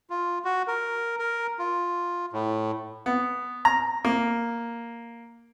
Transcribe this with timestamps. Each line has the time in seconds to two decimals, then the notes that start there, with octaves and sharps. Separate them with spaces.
0.10 F4
0.45 F#4
0.68 A#4
1.19 A#4
1.59 F4
2.33 A2
3.06 B3
3.65 A#5
4.05 A#3